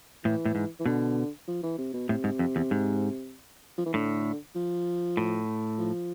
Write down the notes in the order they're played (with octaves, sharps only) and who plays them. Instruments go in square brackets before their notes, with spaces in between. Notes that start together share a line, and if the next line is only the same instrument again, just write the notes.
[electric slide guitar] A2 [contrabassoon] E3
[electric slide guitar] A2
G#2
[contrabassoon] E3
[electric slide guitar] B2 [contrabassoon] D3
[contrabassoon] F3
E3
C3
B2
[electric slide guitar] A2 [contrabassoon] C3
[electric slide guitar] G#2
F2
E2
G#2
[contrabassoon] F3
E3
[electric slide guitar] A2 [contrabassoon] D3
[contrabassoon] F3
[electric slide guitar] A2
[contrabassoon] F3